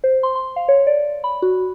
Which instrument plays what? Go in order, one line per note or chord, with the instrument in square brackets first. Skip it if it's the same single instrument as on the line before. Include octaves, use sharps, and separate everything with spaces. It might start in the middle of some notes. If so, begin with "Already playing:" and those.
[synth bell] C5
C6
C6
F5
C#5
D5
B5
F#4